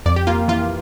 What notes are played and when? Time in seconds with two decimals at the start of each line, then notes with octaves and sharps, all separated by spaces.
0.06 F2 D5
0.16 G4
0.27 A#3 F4
0.48 E3 F4